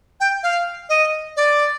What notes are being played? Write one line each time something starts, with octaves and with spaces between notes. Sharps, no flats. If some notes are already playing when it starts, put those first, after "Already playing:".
G5
F5
D#5
D5